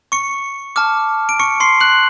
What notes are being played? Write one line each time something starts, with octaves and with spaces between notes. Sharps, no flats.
C#6 C#7
A5 D6 F6
D7
C#6 C#7
C6 C7
F#6 F#7